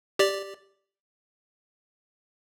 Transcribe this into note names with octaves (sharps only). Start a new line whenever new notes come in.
G4 D5